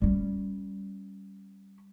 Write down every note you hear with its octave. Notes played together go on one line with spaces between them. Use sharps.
G3 C#4